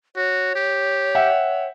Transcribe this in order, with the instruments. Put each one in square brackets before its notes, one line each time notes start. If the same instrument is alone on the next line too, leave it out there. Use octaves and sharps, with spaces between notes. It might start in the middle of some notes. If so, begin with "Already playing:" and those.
[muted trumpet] F#4 [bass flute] C#5
[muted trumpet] G4
[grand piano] E5 F#5 G5